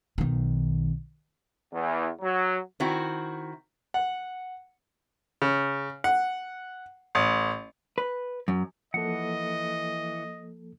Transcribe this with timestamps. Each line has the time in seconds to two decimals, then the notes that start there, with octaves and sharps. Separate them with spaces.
0.18 B1 D#3
1.72 E2
2.22 F#3
2.80 D#3 C4 E4 F#4
3.94 F#5
5.42 C#3
6.04 F#5
7.15 A1
7.98 B4
8.48 F#2
8.94 E3 F3 A#3 A4 D#5 F#5